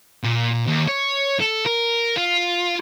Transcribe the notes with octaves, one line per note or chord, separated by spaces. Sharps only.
A#2
D#2
C#5
A4
A#4
F4